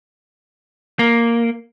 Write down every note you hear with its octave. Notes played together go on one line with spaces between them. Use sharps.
A#3